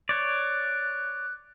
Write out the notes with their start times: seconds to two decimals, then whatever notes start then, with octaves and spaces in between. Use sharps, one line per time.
0.09 C#5 D5 F#6